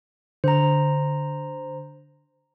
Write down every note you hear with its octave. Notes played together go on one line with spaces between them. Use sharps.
D3 C5 A#5